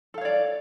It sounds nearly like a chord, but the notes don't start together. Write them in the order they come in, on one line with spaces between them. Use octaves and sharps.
A4 F5 C#5 D5